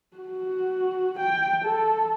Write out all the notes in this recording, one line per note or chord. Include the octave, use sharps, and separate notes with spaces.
F#4
G5
A4